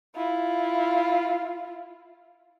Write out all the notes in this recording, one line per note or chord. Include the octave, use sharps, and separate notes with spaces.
E4 F4